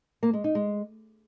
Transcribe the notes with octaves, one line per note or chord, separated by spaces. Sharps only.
A#3
G#3
D#4
G#3